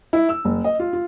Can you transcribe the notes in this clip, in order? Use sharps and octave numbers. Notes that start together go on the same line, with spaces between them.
E4
E6
F#1
D#5
F4
F4